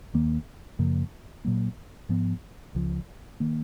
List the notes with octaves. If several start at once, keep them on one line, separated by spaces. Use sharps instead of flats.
D#2 D#3 A#3
F#2 C#3 F3 A#3
A#2 F#3 A#3
G#2 F3 B3
C#2 C#3 F3
D#3 A#3